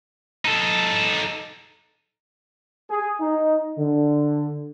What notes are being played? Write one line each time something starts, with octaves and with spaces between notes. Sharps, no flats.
D#4 A4
G#4
D#4
D3